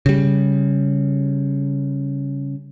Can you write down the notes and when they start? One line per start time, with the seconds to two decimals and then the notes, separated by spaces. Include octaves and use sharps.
0.06 C#3 G3